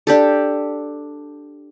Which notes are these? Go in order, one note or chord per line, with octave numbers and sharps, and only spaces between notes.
D4 G4 A4